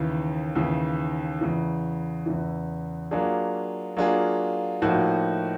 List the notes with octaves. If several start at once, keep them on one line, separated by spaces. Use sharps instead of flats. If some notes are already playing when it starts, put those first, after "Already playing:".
Already playing: D#2 C#3 E3
D#2 C#3 E3
E2 C#3 E3
E2 C#3 E3
F#3 A#3 D4 F4 G#4
F#3 A#3 D4 F4 G#4
A2 F3 A#3 D#4 F#4